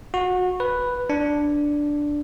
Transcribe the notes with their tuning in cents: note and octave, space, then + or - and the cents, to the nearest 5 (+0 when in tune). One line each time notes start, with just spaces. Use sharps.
F#4 -25
B4 +0
D4 +0